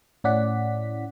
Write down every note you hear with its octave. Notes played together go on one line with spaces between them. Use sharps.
A2 C#4 E4 D5 F#5 B6